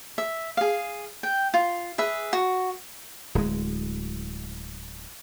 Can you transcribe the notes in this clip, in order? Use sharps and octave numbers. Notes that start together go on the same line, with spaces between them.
E5
G#4 F5
G5
F4
G#4 B4 E5
F#4
D1 G#3